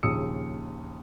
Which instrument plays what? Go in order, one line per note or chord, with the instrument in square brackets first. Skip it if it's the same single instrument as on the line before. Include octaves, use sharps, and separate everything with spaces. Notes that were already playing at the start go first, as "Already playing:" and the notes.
[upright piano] A#1 D#2 C#3 D#6 E6 C#7